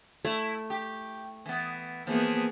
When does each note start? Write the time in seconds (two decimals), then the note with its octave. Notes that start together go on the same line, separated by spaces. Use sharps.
0.25 A3 E4
0.70 G4
1.46 E3 B3
2.07 E3 F3 A#3 B3 G#4